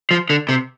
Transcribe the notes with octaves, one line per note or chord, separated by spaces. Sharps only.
F3
D3
C3